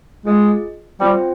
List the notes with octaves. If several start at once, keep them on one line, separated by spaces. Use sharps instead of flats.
G#3 F4 G#4 D#5
G3 C4 F4 C5 G5